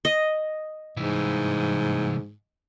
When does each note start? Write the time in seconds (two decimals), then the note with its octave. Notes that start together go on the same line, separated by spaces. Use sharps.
0.05 D#5
0.97 C2 G#2 E3